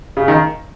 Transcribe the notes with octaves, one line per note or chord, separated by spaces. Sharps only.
C#3
D#3